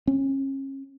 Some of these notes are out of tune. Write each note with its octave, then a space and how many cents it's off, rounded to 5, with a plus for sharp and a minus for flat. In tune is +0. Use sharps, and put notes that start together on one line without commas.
C#4 -35